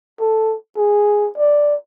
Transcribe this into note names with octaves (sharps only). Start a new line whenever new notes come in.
A4
G#4
D5